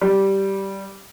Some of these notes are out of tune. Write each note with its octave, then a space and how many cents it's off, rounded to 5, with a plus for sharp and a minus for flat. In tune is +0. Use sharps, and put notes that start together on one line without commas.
G3 -10